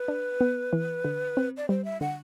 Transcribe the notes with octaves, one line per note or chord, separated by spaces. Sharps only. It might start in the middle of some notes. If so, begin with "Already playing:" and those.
Already playing: B4
D4
B3
E3
D3
C4
D5
G3 C5
E5
D3 F#5